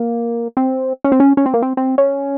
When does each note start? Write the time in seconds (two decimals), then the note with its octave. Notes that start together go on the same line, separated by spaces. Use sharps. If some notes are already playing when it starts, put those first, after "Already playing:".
Already playing: A#3
0.57 C4
1.04 C#4
1.12 C4
1.20 C#4
1.37 C#4
1.46 C4
1.54 A#3
1.62 C4
1.77 C4
1.98 C#4